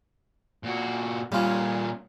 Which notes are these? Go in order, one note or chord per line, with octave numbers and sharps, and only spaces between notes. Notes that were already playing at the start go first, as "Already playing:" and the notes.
A#2 F#4
A#2 G3 C#4 F4